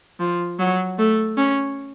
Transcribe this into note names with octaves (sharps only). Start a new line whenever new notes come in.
F3
F#3
A3
C#4